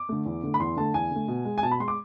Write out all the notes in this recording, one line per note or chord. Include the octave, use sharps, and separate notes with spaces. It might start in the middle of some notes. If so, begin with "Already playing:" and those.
Already playing: D6
D3 A3
E2
D3 A3
B5
E2 C6
D3 A3 A5
E2 G#5
D3 A3
B2
G#3
G#5
B2 A5
B5
G#3 C6
D6